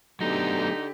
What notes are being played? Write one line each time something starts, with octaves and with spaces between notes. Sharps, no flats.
D3 F#3 A3 B3 D#4 G4